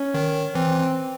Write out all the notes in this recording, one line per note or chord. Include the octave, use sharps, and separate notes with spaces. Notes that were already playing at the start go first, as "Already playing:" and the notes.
Already playing: C#4
D#3
E3 C4